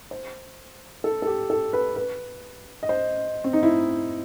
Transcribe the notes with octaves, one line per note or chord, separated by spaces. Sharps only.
C5
A4
A4
G4
A4
B4
B4
D#5
C5
C4
D#4
E4